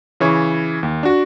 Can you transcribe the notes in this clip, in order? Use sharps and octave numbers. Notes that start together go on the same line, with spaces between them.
C#3 E3 C#5
D#2
D4 F#4